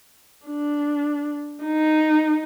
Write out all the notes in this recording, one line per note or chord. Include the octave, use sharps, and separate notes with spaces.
D4
D#4